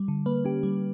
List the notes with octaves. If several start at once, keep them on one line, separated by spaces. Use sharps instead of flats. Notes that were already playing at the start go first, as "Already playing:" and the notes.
Already playing: G3
D3
A#3 B4
C#4 G4
G3